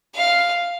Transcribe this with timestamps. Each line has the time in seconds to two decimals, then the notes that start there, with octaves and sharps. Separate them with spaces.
0.15 F5